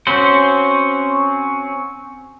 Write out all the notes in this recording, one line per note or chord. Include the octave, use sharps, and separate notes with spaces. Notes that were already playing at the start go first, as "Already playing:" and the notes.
C4 C#4 F#4 C5